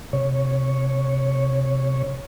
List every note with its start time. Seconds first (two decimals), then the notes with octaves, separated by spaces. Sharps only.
0.13 C3 C#5